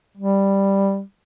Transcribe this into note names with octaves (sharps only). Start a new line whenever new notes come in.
G3